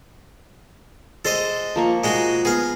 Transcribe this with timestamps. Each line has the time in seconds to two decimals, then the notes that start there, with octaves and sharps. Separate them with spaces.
1.25 G#3 A4 C5 D#5
1.76 F3 A#3 C#6
2.04 G#3 D#4 F#4
2.45 B3 G#4 F5